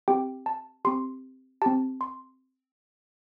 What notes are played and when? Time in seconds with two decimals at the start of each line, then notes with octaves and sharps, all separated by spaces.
0.08 C4 G4 G5
0.46 A5
0.85 C4 G4 C6
1.62 C4 G4 A5
2.01 C6